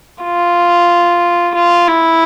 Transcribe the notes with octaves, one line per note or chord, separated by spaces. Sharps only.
F4
F4
E4